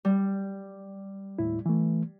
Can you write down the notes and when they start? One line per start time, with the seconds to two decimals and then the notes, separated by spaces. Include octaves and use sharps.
0.05 G3
1.39 D#2 A2 E4
1.66 E3 A3